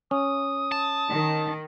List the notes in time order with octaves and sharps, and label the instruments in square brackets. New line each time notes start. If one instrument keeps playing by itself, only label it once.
[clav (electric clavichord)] C#4 [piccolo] D#6
[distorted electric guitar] A5
[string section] D#3